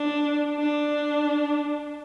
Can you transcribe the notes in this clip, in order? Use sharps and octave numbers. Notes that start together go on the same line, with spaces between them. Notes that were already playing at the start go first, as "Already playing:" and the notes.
Already playing: D4
D4